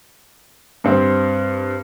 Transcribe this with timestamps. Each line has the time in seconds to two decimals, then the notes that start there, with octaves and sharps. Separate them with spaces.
0.84 G2 C4